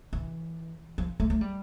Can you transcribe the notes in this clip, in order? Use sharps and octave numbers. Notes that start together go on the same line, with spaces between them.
E3
F3
A3
A3
G3